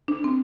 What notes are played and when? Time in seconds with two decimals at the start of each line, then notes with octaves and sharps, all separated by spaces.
0.08 D4
0.24 C4